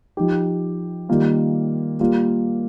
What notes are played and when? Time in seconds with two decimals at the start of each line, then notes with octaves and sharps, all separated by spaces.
0.17 F3 D#4 G4
1.09 D#3 G3 A#3 F4
2.00 G3 A#3 F4